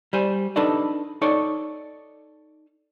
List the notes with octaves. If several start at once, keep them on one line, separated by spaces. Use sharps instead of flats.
G3 C5 G#5
D4 D#4 A4 B4 D5 D#5
D#4 A4 C#5 D5